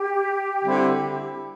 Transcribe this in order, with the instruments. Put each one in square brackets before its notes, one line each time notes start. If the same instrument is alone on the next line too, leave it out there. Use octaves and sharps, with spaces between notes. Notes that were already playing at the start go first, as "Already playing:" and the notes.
Already playing: [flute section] G4
[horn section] D3 G3 C4 E4